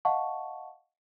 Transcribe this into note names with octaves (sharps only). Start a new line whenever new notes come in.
D#5 F5 F#5 A5 C#6